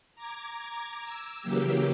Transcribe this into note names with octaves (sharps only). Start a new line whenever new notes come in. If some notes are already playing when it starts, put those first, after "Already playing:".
A#5 D6 G#6
E6
C#3 E3 F#3 A#3 G4